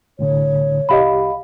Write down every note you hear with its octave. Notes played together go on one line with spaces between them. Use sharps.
C2 A2 D3 C#5
C2 G4 D#5 F5 B5